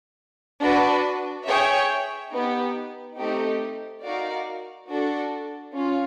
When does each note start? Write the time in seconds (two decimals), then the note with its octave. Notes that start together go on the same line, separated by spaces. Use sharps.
0.61 D4 F#4 B4
1.47 G#4 C#5 E5 G5
2.33 B3 D#4 G4
3.18 A3 C4 D#4 G4
4.04 D#4 F#4 A#4 D5 F5
4.90 D4 F#4 A4
5.75 C#4 F4